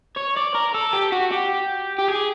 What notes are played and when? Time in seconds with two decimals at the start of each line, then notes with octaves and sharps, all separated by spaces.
0.16 C#5
0.36 D5
0.54 A#4
0.74 A4
0.93 G4
1.12 F#4
1.32 G4
1.98 G4
2.08 G#4